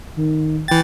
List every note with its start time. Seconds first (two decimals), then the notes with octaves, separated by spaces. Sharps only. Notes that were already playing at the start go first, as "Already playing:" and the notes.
0.16 D#3
0.68 E3 G5 A6